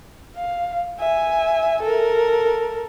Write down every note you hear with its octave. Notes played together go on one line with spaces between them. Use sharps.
F5
E5 G#5
A4 A#4